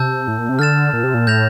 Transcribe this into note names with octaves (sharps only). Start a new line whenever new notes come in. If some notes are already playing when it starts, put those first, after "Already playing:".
Already playing: C3 A5 E6 G6
A2
A#2
C3
D3 F6 A6 E7
A#2
C3
A#2
A2 G6 A#6 F7